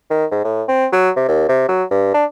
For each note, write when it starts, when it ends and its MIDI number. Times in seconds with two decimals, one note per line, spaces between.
0.10 0.26 51
0.32 0.43 44
0.44 0.63 45
0.68 0.87 60
0.93 1.10 54
1.16 1.28 48
1.28 1.46 39
1.49 1.64 48
1.69 1.84 54
1.91 2.12 43
2.14 2.25 62